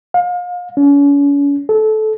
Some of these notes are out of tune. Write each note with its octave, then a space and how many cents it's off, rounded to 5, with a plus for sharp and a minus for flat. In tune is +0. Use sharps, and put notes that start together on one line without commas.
F5 +35
C#4 +40
A4 -20